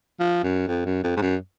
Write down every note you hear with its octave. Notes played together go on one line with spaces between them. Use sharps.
F3
F#2
F2
F#2
F2
G#2
F#2